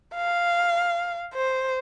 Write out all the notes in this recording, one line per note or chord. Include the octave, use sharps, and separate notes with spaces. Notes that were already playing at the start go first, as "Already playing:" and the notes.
F5
C5